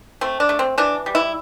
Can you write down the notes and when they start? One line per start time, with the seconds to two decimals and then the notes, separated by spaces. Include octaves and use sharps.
0.21 A3 C4
0.40 D4
0.49 A3
0.59 C4
0.78 E3 D4
1.06 G3
1.15 E4